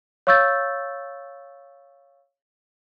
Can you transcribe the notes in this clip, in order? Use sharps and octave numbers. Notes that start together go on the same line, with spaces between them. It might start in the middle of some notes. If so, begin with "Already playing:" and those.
C#5 F5 C#6 E6 G6 A6